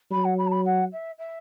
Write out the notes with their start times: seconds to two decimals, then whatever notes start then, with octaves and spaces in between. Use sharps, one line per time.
0.11 F#3 B5
0.24 F#5
0.38 B5
0.47 A5
0.51 B5
0.65 F#5
0.92 E5
1.19 E5